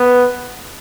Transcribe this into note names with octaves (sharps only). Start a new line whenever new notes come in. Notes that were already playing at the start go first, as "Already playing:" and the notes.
Already playing: B3